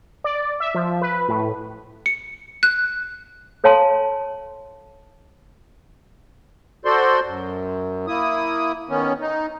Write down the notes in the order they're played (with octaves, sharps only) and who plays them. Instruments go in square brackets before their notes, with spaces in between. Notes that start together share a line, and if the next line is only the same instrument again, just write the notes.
[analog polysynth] D5
E5
F3
B4
A2
[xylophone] C#7
F#6
[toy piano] A4 C#5 F5 G#5 A5 C6
[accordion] F#4 A4 C5 D5 C6
F#2
A#3 E4 D#6
D#3 B3 C#4
D#4